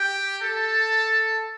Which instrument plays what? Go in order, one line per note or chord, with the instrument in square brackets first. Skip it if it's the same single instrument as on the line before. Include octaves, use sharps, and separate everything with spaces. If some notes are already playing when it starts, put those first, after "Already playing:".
Already playing: [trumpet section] G4 G5
A4 A5